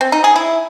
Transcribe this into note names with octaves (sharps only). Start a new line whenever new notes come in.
C4
D#4
G#4
E4